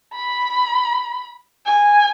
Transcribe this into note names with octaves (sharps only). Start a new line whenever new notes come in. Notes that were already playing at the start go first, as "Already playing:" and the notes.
B5
G#5